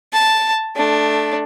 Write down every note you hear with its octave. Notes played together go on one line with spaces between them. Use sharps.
A5
A3 D4